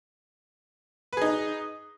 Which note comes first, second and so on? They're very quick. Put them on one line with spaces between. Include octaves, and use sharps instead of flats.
B4 G#4 D#4